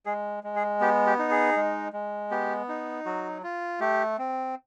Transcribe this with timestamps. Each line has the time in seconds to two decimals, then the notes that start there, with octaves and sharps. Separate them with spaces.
0.06 G#3 G#4
0.44 G#3
0.56 G#4
0.81 B3 G4
1.07 G4
1.19 D#4
1.31 G#4
1.57 G#3
1.93 G#3
2.31 B3 G4
2.69 D#4
3.06 F#3 F#4
3.43 F4
3.80 A3 G4
4.18 C4